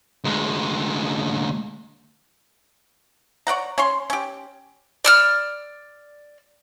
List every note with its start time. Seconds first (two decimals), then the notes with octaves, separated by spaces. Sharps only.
0.24 D2 G#3
3.47 C#5 D5 F#5 A#5
3.78 C#4 C#5 C6
4.10 C#4 G4
5.05 D5 E6 F6